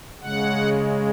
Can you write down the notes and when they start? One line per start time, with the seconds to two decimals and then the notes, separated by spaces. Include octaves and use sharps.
0.21 C#3 G#3 F#5